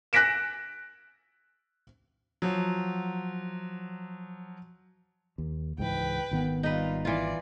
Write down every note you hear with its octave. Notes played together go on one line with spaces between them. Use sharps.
F#6 A#6 B6 D7 E7
F3 F#3
D#2
C#2 G#2 E3 B4 G5
G#1 D#3 B3
G3 D#4 F4 B4
E3 F4 D5